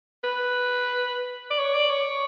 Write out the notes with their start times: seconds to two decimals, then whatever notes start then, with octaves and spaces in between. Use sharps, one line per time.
0.24 B4
1.50 D5
1.59 C#5
1.74 D5
1.90 C#5